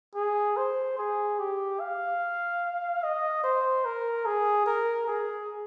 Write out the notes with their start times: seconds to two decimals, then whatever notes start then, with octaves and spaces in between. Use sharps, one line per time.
0.15 G#4
0.57 C5
0.98 G#4
1.39 G4
1.80 F5
3.03 D#5
3.44 C5
3.85 A#4
4.26 G#4
4.66 A#4
5.07 G#4